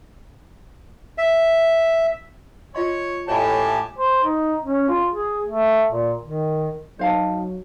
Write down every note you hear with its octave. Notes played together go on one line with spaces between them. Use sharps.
E5
F4 C#5 D#5 C6
A2 G4 C#5 D#5 G#5 A5 B5
C5
D#4
C#4
F4
G#4
A3
A#2
D#3
F#3 D#4 C5 F5 A5